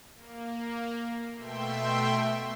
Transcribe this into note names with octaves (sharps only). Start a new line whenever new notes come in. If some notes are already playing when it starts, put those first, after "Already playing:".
A#3
B2 A3 E5 G5 C6